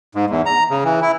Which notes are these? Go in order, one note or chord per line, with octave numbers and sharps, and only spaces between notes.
G#2
E2
A#5
C#3
E3
E4